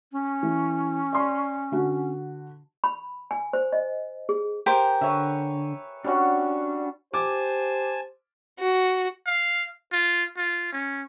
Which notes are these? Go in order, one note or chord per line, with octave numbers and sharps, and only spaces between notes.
C#4
E3
D5 C6
D3 F#4
B5
G#5
C5
D#5
G#4
G4 A#4 C5 G#5
D3 B4 C#5 E5
G3 C#4 D4 F#4
G4 C5 G#5 A5 D6
F#4
F5
F4
F4
C#4